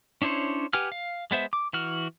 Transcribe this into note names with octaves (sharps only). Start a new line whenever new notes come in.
C#4 D4 E4 C5 C#5
G4 B4 F#5 G#5 F6
F5
G#3 B3 C5 E5
D6
E3 F#4 F6